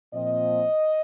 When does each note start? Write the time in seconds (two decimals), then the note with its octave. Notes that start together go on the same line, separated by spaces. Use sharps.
0.13 A#2 F3 C4 D#5